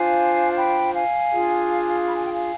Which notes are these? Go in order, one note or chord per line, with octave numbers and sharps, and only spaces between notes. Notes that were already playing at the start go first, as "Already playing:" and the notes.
Already playing: D4 F4 C5 F5 G#5
G5 B5
F5 G#5
D4 F4 G#4
B5
G#5
G5
F5 G#5